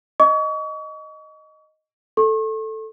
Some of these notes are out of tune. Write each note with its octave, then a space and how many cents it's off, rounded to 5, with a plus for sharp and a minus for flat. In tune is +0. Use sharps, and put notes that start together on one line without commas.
D#5 +0 C#6 +40
A4 +0 C#6 -40